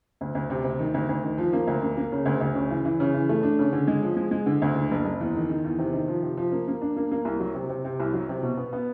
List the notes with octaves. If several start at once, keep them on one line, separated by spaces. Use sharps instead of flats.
D2
D2
C3
D2
D#3
D2
D2
D#3
F3
A#3
D2
A#3
A#3
C#3
D2
D2
C#3
E3
E3
C#3
E3
A3
D4
C#3
D3
G#3
F3
G#3
G#3
D3
D2
D3
F#1
F#1
E2
D#3
D#3
E2
C3
D#3
F3
C3
F3
A#3
A#3
D4
A#3
A#3
C2
F#3
C3
C3
C3
C2
F#3
C3
B2
B3
B3